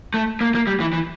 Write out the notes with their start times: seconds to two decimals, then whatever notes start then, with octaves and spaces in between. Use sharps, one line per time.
0.14 A3
0.41 A#3
0.55 A#3
0.67 G3
0.80 E3
0.93 E3